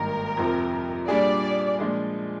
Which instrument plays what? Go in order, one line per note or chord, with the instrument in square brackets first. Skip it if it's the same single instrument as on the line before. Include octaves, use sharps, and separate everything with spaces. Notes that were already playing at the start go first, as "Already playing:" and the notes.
Already playing: [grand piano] G#1 G2 D#3 A#3 [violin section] A#4
[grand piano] F2 C3 F3 C4
[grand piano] A#2 G3 D4 G#4 [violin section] D5
[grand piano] A#2 F3 G#3 D4